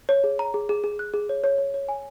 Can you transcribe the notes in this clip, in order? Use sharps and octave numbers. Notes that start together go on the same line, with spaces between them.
C#5
G#4
A#5
G#4
G#4
G#4
F#6
G#4
C#5
C#5
C#5
C#5
G#5